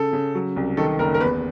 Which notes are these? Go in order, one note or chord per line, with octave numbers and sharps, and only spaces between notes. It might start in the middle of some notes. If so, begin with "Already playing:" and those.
Already playing: C#3 A4
C#3
F#3
C2
D#3 A4
F#1 A#4
A#4
E2 B4